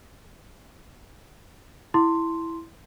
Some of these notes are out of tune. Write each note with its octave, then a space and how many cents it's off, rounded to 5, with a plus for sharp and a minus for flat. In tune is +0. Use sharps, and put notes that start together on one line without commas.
E4 +0 C6 +0